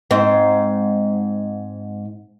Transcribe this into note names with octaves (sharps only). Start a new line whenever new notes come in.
G#2 C4